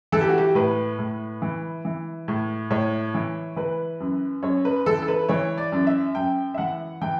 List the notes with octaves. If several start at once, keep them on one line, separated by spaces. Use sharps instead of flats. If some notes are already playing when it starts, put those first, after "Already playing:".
E3 A4
G4
F#4
G4
A2 B4
A2
E3
E3
A2
A2 C#5
E3
E3 B4
F#2
F#2 C#5
B4
E3 A4
A4
B4
E3 C#5
D5
F#2
E5
F#2 G5
E5
E3 F#5
E3 G5